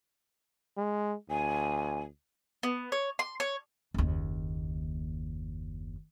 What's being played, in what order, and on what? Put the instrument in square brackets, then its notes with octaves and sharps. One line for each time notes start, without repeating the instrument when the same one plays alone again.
[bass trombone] G#3
[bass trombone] D2 [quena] G#5
[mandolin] B3
C#5
C6
C#5
[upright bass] F#1 D#2